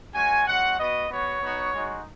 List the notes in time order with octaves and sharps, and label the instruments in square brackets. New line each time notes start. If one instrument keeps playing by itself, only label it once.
[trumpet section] G#3 C#4 F#4 G#5
G#3 C#4 F#4 F#5
B3 F#4 D#5
B3 F#4 C#5
B3 D#4 F#4
G#3 D#4 F#4